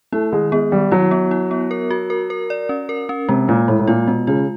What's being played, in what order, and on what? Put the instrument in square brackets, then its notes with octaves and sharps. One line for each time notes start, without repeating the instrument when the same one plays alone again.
[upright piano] A3 [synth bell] E4
[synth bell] D#3 [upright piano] G#3
[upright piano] G#3 [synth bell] B3
[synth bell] D#3 [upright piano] G3
[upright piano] F#3 [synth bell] E4
[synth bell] B3
E4
B3
A#4
F#4
A#4
A#4
D5
C#4
A#4
C#4
[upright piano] C3 [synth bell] G#3
[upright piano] A#2 [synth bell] G#3
[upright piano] A2 [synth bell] G#3
[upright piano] A2
[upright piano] A#2 [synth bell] F4
[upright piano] B2 [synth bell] G#3
[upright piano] C#3 [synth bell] F4